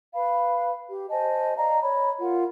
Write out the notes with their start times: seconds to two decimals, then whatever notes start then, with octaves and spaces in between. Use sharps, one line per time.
0.14 B4 F5 B5
0.89 G4
1.10 C5 D#5 G#5 A5
1.56 D5 D#5 F5 A#5
1.81 C#5 B5
2.20 F4 A#4 F#5